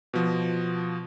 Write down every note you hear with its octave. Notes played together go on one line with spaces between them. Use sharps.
B2 F3